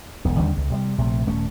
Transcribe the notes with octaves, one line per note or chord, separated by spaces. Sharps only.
E1 B1
D#2 D3 G3 C#4
C#2
C3 F#3 G3
A#1 C3 A3
D#1 A3 C#4